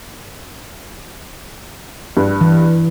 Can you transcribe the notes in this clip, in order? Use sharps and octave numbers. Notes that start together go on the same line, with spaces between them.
G2
E3